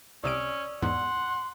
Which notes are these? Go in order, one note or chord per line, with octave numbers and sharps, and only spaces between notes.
C2 C3 C#4 D5 D#6 E6 D7
E2 G#2 F#5 C6